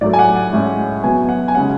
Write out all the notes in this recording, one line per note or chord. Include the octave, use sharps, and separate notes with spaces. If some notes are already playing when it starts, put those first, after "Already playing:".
A2 F#3 A3 D5
G#5
F#5
F#5
A2 G#3 C#4
B2 F#3 B3 G#5
F#5
G#5
C#3 G#3 C#4 F#5